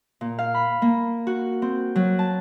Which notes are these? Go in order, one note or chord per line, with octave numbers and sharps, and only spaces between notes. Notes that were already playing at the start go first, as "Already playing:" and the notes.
A#2
F5
B5
A#3
F#4
C4
F#3
A5